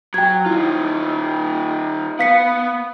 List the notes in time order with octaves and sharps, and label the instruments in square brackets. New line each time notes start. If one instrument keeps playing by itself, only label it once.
[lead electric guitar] F#3 [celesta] G5 G#6
[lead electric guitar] D#3 F4 [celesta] E4
[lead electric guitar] B3 [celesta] F5 B6 C#7